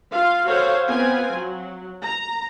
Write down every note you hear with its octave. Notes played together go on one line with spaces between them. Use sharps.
F4 F5
F#4 A4 C5 C#5 F5
B3 C4 F4 G#5
F#3
A#5